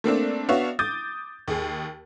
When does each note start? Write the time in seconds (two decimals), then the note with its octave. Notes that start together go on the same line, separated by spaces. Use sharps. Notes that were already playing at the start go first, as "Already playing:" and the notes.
0.04 A3 A#3 C4 D4
0.49 B3 D4 F#4 C#5 E5 F5
0.79 D6 D#6 G6 A6
1.48 D#2 G#4